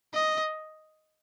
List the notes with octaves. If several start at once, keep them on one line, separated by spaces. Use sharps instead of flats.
D#5